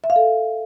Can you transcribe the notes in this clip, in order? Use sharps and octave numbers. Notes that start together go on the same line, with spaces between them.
E5
F5
A4